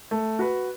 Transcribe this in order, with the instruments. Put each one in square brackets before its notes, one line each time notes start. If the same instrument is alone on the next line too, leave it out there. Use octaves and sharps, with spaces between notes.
[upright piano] A3
F#4 B4